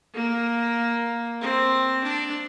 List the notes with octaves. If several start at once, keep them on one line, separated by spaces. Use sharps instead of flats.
A#3
C4
D4